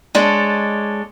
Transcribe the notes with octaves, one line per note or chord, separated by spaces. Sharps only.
G#3 D4 A4 C#5